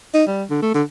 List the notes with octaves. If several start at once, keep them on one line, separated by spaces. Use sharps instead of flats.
D#4
G3
D3
A3
D3